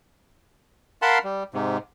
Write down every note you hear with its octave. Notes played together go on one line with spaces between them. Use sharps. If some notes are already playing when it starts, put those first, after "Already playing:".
A#4 F5 F#5 A5 B5 C6
G3
G#2 C3